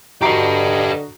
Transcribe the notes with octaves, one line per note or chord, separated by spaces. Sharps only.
D3 F#4 G4 B4 D#5 A#5 C7